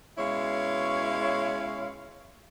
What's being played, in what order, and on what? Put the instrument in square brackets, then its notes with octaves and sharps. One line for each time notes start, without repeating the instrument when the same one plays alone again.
[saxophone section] B2 G#3 C#4 E4 C#5 F5